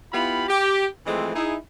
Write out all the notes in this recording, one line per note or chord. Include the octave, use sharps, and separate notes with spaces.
B3 E4 F4 G4 F5 B5
G4
E3 F3 G#3 A3 C4
D#4 E4 G#4